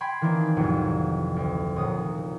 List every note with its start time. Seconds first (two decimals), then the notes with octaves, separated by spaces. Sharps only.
0.01 G5 G#5 B5 C6 G#6
0.21 D#3 E3 A#3 C4 D4
0.56 A1 F2 C3 F#3
1.36 D2
1.76 D#1 A#1 D#6